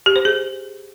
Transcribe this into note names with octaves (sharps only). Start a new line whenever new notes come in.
G4
C5
G#4